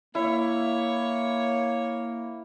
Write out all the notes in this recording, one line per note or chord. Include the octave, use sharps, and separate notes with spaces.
A#3 E4 C#5